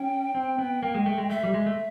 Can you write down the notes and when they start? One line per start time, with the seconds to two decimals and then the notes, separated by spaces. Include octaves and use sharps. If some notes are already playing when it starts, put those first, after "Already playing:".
Already playing: C#4 G5
0.35 C4
0.59 B3
0.83 A#3
0.94 G#3
1.06 A3
1.18 G#3
1.30 A3 E5
1.43 G3
1.54 G#3
1.66 A3